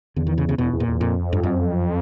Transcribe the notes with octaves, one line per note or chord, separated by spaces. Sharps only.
E2 D3
D#3
C#3
C#3
E2 B2
E2
A#2
E2
F2 A#2
G2
F#2